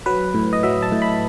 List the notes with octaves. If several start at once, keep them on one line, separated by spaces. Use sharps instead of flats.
F#3 B4
A2
D#5
F#3 E5
A5
A2
B5